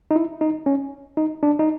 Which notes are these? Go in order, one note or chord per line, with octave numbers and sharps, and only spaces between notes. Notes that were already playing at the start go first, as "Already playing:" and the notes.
D#4
E4
D#4
C#4
D#4
D4
D#4